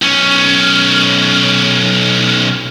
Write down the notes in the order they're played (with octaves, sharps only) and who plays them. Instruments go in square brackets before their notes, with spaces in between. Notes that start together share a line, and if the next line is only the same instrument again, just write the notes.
[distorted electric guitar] B1 C#4